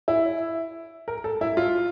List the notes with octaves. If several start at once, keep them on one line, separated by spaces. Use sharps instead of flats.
E4
A#4
A4
E4
F4